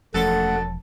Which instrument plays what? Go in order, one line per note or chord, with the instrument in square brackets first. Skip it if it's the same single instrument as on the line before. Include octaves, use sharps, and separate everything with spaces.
[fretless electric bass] E1 F3 [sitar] F#2 A4 [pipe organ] A3 F#5